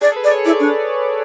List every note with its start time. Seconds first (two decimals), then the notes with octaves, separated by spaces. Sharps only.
0.01 G#4 D5
0.12 A4
0.16 B4
0.24 D5
0.31 C#5
0.45 E4 D5
0.60 D4